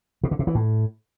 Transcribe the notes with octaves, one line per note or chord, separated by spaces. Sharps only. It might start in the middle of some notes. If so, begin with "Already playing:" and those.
B2
D3
C3
E3
A2